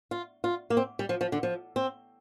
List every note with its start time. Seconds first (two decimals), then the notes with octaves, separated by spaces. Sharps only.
0.11 F4
0.44 F4
0.70 A#3
0.77 C4
0.99 G3
1.09 F3
1.21 F3
1.32 D3
1.43 F3
1.76 C4